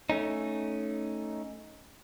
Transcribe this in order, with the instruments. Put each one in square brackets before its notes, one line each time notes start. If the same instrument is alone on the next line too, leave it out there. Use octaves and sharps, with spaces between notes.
[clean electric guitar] A3 C#4 D#4